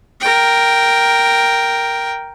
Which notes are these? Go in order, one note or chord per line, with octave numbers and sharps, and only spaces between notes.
A#4 G5